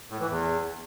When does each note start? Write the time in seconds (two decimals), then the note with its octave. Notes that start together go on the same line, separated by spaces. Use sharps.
0.10 A2
0.20 E3
0.30 E2